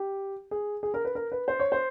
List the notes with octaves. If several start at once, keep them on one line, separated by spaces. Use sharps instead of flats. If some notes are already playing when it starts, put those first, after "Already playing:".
Already playing: G4
G#4
G#4
A#4
B4
A#4
B4
C5
C#5
C5